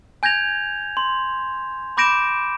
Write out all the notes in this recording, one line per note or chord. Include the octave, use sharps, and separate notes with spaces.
G#5 G6 G#6 A#6 F7
C6
B5 D6 G6 A#6 D7 E7